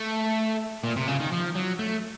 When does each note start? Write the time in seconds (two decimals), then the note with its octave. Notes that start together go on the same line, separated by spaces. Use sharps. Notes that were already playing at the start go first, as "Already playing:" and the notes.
Already playing: A3
0.84 A#2
0.96 C3
1.08 C#3
1.20 D#3
1.32 F3
1.56 F#3
1.79 A3